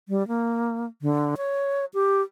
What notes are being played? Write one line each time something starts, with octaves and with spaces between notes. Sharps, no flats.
G3
A#3
D3
C#5
G4